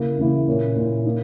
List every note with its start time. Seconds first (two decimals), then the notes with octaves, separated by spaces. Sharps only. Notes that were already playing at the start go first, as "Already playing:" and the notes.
Already playing: C#3 A#3 E4
0.18 C#3 E3 A#3 E4
0.48 A#2 A#3 C#4 E4
0.76 A#2 A#3 C#4 E4
1.05 A#3 D#4